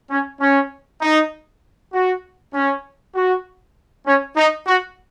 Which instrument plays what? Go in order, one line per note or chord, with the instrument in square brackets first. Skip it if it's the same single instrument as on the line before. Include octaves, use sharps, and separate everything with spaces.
[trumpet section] C#4
C#4
D#4
F#4
C#4
F#4
C#4
D#4
F#4